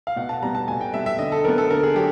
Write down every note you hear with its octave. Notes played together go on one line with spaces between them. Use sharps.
F5
B2 F#5
A5
G3 B3 A#5
A5
B2 G#5
G5
G3 B3 E5
E5
D3 D#5
A4
F#3 B3 A#4
A4
D3 A#4
G#4
F#3 G4